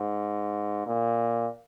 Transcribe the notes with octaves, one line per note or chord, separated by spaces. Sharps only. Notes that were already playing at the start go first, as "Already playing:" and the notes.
Already playing: G#2
A#2